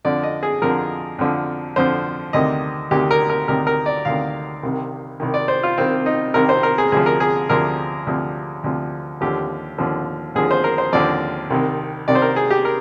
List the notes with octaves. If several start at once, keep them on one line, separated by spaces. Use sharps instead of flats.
F2 D3 F3 D5
D#5
G#4
F2 D3 F3 A#4
F2 D3 F3
F2 D3 F3 C5
D2 C3 D#3 D#5
D2 C3 D#3 G4
A#4
A#4
D2 C3 D#3 A#4
A#4
D5
D2 C3 D#3 F5
C2 C3 D#3
C2 C3 D#3
D5
C5
F4
C2 C3 D#3 C4
D#4
C2 C3 D#3 A#4
C5
A#4
G#4
D2 C3 F3 G#4
A#4
G#4
D2 C3 F3 A#4
D2 C3 F3
D2 C3 F3
D#2 D3 F3 G4
D#2 D3 F3
D#2 D3 F3 G#4
C5
A#4
C5
D#2 D3 F3 D5
C2 C3 D#3
C2 C3 D#3 D5
C5
A#4
G#4
G4
A#4